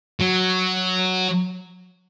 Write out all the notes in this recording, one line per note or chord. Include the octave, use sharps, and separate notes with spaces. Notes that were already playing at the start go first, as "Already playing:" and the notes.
F#3